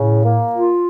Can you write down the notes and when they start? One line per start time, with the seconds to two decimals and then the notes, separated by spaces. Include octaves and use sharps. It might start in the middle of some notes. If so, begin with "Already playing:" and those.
Already playing: A2 C#3
0.23 A#3
0.54 F4